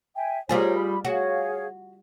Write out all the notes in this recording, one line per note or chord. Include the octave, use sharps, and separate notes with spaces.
E5 G5 G#5
G3 F4 G#4 A#4 C5 C#5
B5
F#4 G#4 C#5 F5